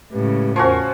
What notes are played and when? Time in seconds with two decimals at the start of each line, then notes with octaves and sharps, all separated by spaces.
0.12 A2 C#3 G#3 G4 B4
0.56 E2 F3 C#4 F#4 A#4 C#6